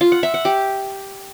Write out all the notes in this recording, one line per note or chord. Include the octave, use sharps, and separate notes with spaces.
F4
F#5
E5
F#5
G4